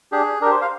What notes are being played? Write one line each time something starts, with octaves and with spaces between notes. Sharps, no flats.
D4 G4 G#4
D4 G4 A#4
C5
F5